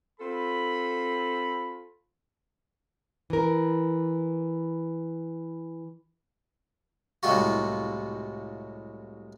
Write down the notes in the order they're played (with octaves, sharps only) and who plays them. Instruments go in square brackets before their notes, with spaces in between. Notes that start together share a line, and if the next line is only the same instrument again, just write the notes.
[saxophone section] C4 F4 A4 [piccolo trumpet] B5
[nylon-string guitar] E3 A#4
[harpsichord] C2 A2 C3 G#3 F4 F#4